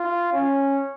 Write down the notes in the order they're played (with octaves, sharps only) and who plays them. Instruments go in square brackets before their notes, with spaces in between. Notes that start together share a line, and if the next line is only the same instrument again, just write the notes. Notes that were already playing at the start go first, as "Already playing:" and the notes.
Already playing: [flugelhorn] F4
C#4